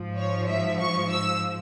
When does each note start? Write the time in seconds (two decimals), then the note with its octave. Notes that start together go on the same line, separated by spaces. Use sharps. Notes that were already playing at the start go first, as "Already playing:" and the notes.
Already playing: G#2 F3
0.17 C#5
0.48 E5
0.79 C#6
1.11 E6